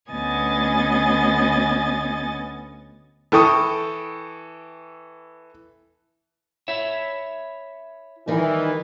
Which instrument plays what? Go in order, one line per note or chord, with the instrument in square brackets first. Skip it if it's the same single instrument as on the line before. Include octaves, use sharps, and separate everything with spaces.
[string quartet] D2 B3 C#4 D#5 G#5 A6
[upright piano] E3 A4 G5 C#6 D#6
[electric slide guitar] E4 C#5 E5
[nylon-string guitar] D#3 G3 D#4 [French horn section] E3